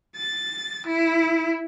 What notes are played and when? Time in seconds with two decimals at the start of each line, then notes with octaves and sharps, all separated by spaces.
0.16 A6
0.87 E4